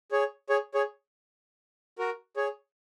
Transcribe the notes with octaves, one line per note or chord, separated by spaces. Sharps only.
G#4 C#5
G#4 C#5
G#4 C#5
F#4 A#4
G#4 C#5